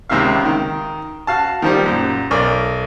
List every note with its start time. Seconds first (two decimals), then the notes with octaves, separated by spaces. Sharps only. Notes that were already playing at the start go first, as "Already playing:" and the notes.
0.09 C#2 C3 D#3 E5 F5
0.45 D#3
1.27 F#4 F5 A5
1.62 D#3 F3 G3
1.86 F#2 A#2
2.31 B1 A#4 D5